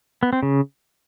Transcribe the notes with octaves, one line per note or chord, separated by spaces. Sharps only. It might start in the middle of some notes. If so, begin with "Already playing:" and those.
B3
C4
C#3